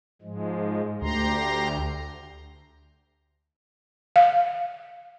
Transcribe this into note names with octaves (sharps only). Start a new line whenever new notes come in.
G#2 F3 G#3
D2 G4 A#5 C6
F5